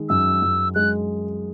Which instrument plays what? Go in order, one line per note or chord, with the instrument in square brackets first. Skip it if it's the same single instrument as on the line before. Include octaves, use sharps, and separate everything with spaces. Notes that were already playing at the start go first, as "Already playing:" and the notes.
Already playing: [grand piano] D#3 G#3
[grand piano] F#2 [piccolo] E6
[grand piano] F#2
[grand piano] G#3 [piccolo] F#6